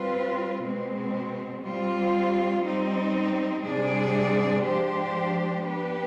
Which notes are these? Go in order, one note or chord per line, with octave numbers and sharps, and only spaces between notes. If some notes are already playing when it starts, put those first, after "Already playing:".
Already playing: G3 C4 F4 B4
B2 G#3 C4
G3 C4 F4
G3 C4 D#4
C3 G3 D4 G#4 D5
F3 G#3 D4 G4 C5
B3 D4 G4 B4